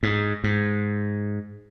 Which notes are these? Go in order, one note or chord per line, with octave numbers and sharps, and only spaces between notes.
G#2
G#2